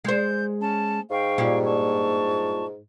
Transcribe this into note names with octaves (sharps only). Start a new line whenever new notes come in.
G#3 C5 G6
C#4 A5
G#2 F5 G5 C#6
G2 A#2 G4
A5 C#6